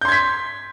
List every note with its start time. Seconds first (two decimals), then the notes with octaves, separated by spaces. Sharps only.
0.01 G6
0.05 C6
0.08 G#6
0.12 B6